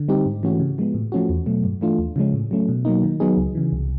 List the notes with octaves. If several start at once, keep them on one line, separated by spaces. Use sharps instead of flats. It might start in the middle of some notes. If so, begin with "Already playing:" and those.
Already playing: D3
G3 C4 D#4 G4
G#2
E3 A3 C#4 F#4
C#3
F3 G#3 B3
A2
F3 A3 C#4 F#4
E2
B2 F#3 A3
G2
E3 A3 D4 F4
D#2
C#3 F3 G#3 C#4
A2
F#3 A3 C#4
B2
F#3 A#3 D#4
D#3
F#3 B3 D#4 G#4
C#2
C#3 E3
C2